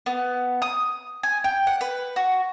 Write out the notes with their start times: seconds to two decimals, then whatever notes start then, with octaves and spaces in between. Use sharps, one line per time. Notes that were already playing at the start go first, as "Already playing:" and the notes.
0.06 B3
0.62 D#6
1.23 G#5
1.44 G5
1.67 F#5
1.81 B4
2.16 F#4